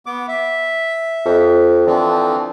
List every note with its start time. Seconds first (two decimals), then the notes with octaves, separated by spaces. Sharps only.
0.06 B3 D6
0.28 E5
1.25 F2
1.87 D3 E3 F3 C4